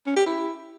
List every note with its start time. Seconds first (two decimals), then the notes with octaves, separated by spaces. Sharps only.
0.06 C#4
0.16 G4
0.26 E4